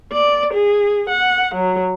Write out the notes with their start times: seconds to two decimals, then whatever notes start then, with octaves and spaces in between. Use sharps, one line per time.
0.12 D5
0.53 G#4
1.10 F#5
1.55 F#3